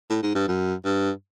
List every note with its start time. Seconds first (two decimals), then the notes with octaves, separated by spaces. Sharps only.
0.10 A2
0.22 G#2
0.35 G2
0.48 F#2
0.84 G2